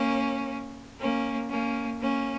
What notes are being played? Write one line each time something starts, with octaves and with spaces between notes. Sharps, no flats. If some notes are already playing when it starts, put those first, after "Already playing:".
Already playing: A#3 C#4
A#3 C#4
A#3 C#4
A#3 C#4